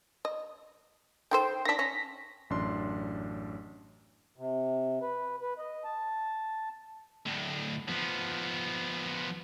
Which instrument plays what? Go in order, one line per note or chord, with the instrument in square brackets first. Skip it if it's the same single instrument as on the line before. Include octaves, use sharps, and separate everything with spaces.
[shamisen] D#5
[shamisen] D#3 A4 C5 [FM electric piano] G5 C6
[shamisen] D#3 D4 [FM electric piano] A#6 B6
[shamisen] C#4
[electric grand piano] A1 F#2 D4 C6
[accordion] C3
B4
B4
D#5
A5
[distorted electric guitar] D2 A2
F3 B3